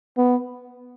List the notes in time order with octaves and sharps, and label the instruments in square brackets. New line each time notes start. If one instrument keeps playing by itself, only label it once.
[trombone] B3